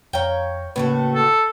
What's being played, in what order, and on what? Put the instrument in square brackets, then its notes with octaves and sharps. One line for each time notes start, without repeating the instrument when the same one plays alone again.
[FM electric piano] F2 F5 A#5 [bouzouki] C#5 G5
[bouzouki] A2 A3 F#4 [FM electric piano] C#3 A#3 B4
[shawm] A4